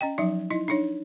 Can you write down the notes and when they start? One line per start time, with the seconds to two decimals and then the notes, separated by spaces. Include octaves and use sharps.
0.01 C#4 D#5 G5
0.18 F3 F#3 D#4 E5
0.50 D#4 E4 D#5
0.68 D4 D#4 C#5